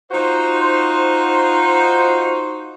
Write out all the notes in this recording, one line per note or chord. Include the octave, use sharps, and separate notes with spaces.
D#4 F4 F#4 C5